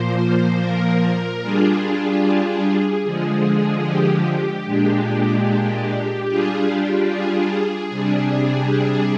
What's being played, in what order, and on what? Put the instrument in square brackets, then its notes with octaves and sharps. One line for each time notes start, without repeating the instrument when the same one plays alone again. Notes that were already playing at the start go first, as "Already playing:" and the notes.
Already playing: [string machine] A#2 F3 A#3 C5
A#4
G3 D4 F4 G#4
D3 F3 G#3
G4
A#2 G#3 D4
G3 D4 F4 G#4
G4
G#4
C3 G3 D4
G#4